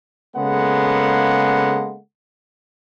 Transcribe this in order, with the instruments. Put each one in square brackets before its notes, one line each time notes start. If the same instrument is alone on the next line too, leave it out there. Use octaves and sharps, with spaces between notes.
[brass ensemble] C#3 G#3 A#3 B3 A4 F#5